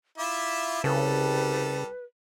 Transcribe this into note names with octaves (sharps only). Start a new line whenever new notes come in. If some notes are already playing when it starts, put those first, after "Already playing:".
E4 F4 E5 D6
C2 C#3 G3 A4 B4